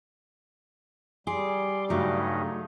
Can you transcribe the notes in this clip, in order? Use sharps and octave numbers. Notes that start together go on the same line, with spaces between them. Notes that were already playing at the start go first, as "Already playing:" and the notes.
G3 G#4 C6 D6
G2 C#3 F#3 A3 D#4